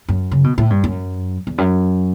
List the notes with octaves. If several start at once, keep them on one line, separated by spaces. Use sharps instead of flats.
F#2
C#3
B2
A2
G2
F#2
E2
F#2